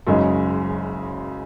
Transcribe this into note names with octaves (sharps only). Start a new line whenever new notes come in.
F#1 F#2 C#3 G#3 D#4